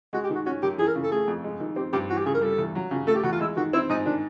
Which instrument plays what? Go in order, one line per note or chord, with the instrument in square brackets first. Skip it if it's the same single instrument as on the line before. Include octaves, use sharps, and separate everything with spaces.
[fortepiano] G#3 [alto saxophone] F#4
[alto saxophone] G4
[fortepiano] D#3 [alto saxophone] F#4
[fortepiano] C#4 [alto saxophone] F#4
[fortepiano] F#2 [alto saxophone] G4
[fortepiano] E3 [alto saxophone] G#4
[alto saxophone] A#4
[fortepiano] C#3
[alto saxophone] A4
[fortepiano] A3 [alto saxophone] G#4
[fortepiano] F2
G#3
D#3
[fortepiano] C4 [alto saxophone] G4
[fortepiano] G2 [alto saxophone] G4
[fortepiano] E3 [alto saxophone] F#4
[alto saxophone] G4
[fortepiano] C#3 [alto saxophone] G#4
[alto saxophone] A#4
[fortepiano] G3 [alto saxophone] A4
[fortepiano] E2
F#3
C#3
[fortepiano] A3 [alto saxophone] A4
[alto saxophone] G4
[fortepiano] E2 [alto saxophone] F#4
[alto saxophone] F4
[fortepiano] G#3 [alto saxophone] E4
[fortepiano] D#3 [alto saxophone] F#4
[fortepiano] C4 [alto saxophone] E4
[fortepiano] G#2 [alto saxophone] D#4
[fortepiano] D#3 [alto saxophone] D4